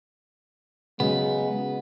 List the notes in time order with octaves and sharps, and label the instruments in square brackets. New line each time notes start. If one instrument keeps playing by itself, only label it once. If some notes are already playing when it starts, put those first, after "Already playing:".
[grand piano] C#3 F#3 [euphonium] G#3 [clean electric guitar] B3